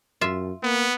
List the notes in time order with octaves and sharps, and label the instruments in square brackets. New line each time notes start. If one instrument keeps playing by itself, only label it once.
[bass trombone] F#2 [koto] F4 E5
[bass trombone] A#3 [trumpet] B3